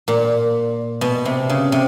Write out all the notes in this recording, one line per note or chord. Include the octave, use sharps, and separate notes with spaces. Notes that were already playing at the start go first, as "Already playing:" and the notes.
A#2
B2
C3
C#3
C3